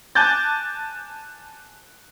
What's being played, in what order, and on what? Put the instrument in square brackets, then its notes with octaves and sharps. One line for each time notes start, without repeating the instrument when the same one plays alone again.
[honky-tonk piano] G#5 A5 D6 F#6 G6 A6